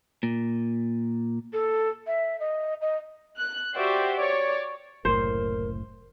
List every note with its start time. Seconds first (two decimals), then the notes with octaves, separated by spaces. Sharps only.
0.23 A#2
1.53 A4
2.07 E5
2.40 D#5
2.81 D#5
3.37 F#6
3.74 F#4 G4 C5 D5 E5
4.14 C#5 D5
5.05 F#1 C2 A2 A#4 C5